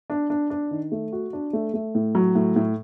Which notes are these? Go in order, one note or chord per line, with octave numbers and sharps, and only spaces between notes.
D4
D4
D4
D#3
A3
F#4
D4
A3
A3
A2
F#3
A2
A2